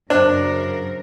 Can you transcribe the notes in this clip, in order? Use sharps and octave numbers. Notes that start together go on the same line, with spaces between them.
F#2 C#3 D4 A#4 C5